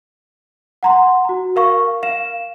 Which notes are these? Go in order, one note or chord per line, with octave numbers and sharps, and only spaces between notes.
F#5 A#5 C6
F#4 A#5
A#4 F5 C#6
F5 E7